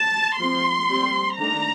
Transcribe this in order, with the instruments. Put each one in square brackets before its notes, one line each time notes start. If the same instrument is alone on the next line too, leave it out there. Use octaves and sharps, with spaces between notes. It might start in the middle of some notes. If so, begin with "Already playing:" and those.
Already playing: [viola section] A5
F3 C4 C6
G3 C4
D#3 A3 D4 A#5